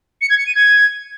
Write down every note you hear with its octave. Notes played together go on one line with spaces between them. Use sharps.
C#7
G#6
C#7
D#7
G#6